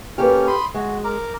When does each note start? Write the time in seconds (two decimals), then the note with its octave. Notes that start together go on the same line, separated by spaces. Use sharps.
0.18 A#3 C#4 G4 A4 B4 F6
0.47 B5 C6 D#6
0.74 G#3 F#4
1.04 A#4 A#5 D6